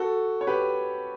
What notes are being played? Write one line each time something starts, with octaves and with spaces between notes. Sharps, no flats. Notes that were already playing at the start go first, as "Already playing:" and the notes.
Already playing: F#4 A4
C#5
G4 B4